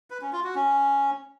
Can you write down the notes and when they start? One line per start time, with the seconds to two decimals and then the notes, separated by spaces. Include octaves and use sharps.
0.10 B4
0.22 C#4
0.33 F4
0.44 F#4
0.55 C#4